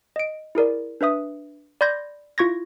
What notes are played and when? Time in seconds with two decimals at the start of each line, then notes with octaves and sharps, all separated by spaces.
0.16 D#5 D7
0.55 E4 G#4 A#4 D5
1.01 D4 B4 E5 D#6
1.81 D5 B5 C6 G6 G#6 A#6
2.38 E4 F4 C#6 G#6 A#6